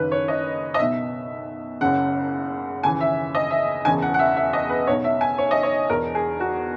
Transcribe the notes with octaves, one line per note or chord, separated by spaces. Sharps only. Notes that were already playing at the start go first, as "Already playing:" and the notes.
Already playing: F#1 F#2 D#3 B4
C#5
D#5
D#5
B1 B2 E5
F#1 F#2 C#3 F#5
D#2 C#3 E3 G#5
E5
D#5
E5
E1 E2 C#3 E3 G#5
F#5
F#5
E5
E5
D#5
B4
B1 B2 C#5
E5
G#5
C#5
D#5
C#5
E1 E2 B2 A#4
G#4
F#4